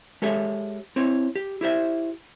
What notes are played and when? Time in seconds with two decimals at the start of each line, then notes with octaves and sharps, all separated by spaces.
0.22 G#3 G4 A4 C#5 E5
0.96 C4 E4 C#5
1.36 G4
1.61 E4 G4 C5 E5